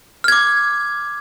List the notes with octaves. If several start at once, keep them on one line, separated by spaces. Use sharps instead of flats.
D6 F6 G#6